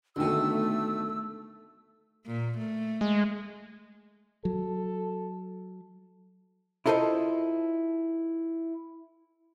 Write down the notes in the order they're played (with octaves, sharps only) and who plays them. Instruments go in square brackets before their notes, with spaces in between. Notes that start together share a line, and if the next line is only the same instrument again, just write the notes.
[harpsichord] B1 B2 [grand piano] D3 D#3 G5 [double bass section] A3 [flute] E6
[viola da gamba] A#2
A3
[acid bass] G#3
[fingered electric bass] F#3 [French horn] A4
[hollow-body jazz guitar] E4 F4 A4 A#4 C5 D#5